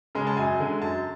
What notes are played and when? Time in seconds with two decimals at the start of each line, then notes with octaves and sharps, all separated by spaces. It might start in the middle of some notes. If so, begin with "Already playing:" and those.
0.15 C#3 G#3
0.27 A5
0.37 F#2 G#5
0.60 D3 G#3
0.81 F#2 A5